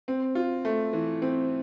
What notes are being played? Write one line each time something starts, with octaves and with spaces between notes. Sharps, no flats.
C4
F4
A3
E3
C4